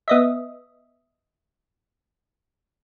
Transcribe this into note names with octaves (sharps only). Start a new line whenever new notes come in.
B3 D#5 E5